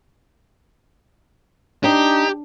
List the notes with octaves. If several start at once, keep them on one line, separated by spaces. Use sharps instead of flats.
D4 D#4 G4